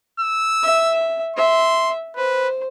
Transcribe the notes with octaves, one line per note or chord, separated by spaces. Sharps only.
E6
E5
E5 C6
B4 C5